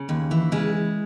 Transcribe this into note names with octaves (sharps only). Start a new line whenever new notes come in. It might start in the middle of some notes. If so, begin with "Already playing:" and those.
Already playing: C#3
D#2
E3
C#3 G#3